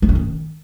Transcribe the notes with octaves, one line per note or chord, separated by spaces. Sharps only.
A#3
C#4
D#3